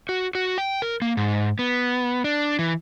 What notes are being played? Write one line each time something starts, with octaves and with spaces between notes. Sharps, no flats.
F#4
F#4
G5
A#4
A#3
G#2
B3
D4
E3